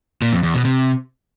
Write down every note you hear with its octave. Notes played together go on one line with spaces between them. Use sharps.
A#2
F2
E2
B2
C3